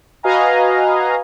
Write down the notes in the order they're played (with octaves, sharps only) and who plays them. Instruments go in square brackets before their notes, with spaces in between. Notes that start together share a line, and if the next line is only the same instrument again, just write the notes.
[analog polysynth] F#4 B4 D#5 F5 G#5 A#5